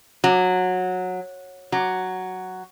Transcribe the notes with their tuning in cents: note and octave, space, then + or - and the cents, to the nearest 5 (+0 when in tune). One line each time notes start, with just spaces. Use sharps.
F#3 -15
F#3 +5